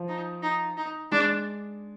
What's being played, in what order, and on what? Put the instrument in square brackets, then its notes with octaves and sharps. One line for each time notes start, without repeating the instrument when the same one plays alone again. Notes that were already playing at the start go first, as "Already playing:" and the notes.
Already playing: [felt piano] F3
[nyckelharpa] D#4
D#4
D#4
[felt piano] G#3 [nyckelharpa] D4